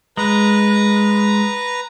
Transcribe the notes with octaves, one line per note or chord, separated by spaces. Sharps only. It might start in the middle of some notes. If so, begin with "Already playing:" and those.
G#3 B4 A#5